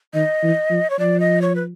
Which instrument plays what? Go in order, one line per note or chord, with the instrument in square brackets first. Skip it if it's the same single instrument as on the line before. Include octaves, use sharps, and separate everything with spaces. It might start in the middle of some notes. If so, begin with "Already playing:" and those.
[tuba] D#3 [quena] D#5
[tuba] E3
F3
[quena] C#5
[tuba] F3 [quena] D5
[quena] D#5
C#5
B4